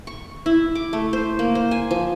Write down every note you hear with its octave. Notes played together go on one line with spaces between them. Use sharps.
C#6
E4
D6
A3
C5
A#3
C5
G#5
F3